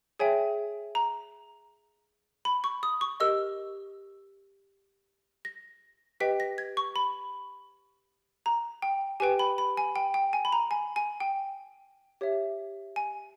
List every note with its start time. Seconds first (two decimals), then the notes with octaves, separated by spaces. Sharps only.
0.20 G#4 C#5 E5 G5 G#5
0.95 A#5
2.45 B5
2.64 C#6
2.83 D#6
3.01 C#6
3.20 G4 A#4 D#5 E6
5.45 A#6
6.20 G4 B4 D#5 G5 B6
6.40 A#6
6.58 G#6
6.77 C#6
6.96 B5
8.46 A#5
8.82 G5
9.20 G4 B4 G5 G#5
9.39 B5
9.58 B5
9.77 G#5
9.96 G5
10.14 G5
10.33 G#5
10.45 B5
10.52 A#5
10.71 G#5
10.96 G#5
11.20 G5
12.21 G4 C#5 E5
12.96 G#5